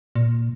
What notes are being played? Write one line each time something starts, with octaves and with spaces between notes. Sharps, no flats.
A#2